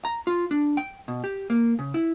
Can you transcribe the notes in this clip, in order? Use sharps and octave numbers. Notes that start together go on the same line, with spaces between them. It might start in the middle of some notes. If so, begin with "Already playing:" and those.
A#5
F4
D4
G5
B2
G4
A#3
C#3
E4